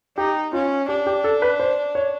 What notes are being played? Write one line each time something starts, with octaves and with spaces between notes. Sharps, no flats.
D#4 G4
C#4 F4
D4 G4
G4
A4
B4
C5
C#5